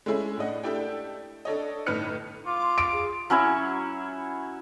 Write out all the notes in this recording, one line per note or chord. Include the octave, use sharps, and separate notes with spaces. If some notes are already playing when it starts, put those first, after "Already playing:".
G#3 A3 C#4 E4 G#4
A2 D4 D#5 F#5
A3 D4 E4 G4 A4 G5
D4 A4 C#5 D#5
G1 A2 D#4 B4 F6 C#7
F4 D6
C6
D7
G#4
F#3 C#4 E4 C#5